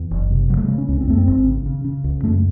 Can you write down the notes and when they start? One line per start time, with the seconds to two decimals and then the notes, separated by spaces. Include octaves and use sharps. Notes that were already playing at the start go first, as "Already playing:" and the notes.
Already playing: E2
0.11 F#1
0.30 C3
0.50 C#3 F#3
0.57 A3
0.64 G#3
0.68 C#3
0.78 C#4
0.88 C#2 C#4
1.01 C4
1.07 F#2 A3
1.18 C4
1.27 G#1
1.46 C#3
1.66 C#3
1.84 C#3
2.04 C#2
2.23 F#2 A3